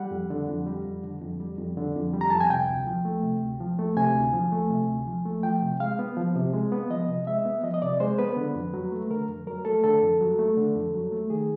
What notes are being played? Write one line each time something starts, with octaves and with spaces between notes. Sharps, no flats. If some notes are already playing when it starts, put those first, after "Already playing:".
Already playing: G3 F#5
F2
D3
F2
G3
F2
D3
F2
G3
F2
D3
F2
G3
A#5
F2 A5
G#5
C3 G5
D2
F3
A3
C3
D2
F3
A3
C3 G#5
D2
F3
A3
C3
D2
F3
A3
F3 G5
C3
G#3 F5
B3
F3
C3
G#3
B3
F3 D#5
C3
G#3 E5
B3
F3 D#5
D#5
C3 D5
G#3 C5
B3 B4
D3
F2
F#3
A3
D3 A#4
F2
F#3 A#4
A3 A4
D3 A4
F2
F#3
A3
D3
F2
F#3
A3
D#3 G#4